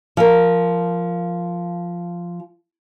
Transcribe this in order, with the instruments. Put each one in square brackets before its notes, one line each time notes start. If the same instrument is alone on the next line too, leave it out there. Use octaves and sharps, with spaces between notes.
[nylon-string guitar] F3 A#4